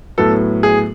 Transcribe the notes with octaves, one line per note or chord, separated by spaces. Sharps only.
A2 F#3 B3 A4
G#4